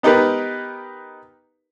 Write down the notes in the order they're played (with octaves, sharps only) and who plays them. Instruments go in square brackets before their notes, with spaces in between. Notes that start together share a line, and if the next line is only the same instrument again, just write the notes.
[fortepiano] B3 D#4 G4 A#4 B4